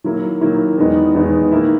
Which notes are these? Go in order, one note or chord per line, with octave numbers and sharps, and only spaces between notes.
D#3 F#3 A#3 E4
D#3 F#3 A#3 E4
E2 D#3 G#3 B3 D#4
E2 D#3 G#3 B3 D#4
D#3 A#3 E4